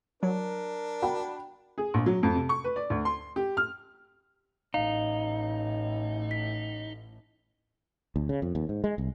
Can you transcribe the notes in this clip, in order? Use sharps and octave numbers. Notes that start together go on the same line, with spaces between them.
F#3 D4 A#4
F#4 G5 B5
G#4
A#1
F#3
F2
C3
C#6
B4
D5
D2
C6
G4
F6
A1 A2 D#4 F5
B6
D2
C#3
F2
D#2
G#2
G#3
C2